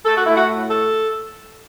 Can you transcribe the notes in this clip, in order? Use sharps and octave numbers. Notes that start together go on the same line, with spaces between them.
A3 A4
F#4
A3 E4
F#4
A2
A3 A4